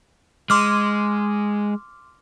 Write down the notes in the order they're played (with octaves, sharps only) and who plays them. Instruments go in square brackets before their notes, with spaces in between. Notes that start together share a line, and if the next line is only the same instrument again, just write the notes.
[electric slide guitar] G#3 [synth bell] C6 D6 F6